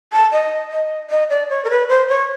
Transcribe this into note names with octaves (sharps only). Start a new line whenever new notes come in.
A5
D#5
D#5
D#5
D5
C#5
A#4
B4
C5
C#5